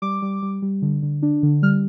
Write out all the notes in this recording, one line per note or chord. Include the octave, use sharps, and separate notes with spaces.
G3 D6
G3
G3
G3
D3
D3
D4
D3
G3 F6